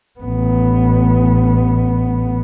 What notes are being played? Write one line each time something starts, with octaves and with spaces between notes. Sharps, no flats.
A1 B3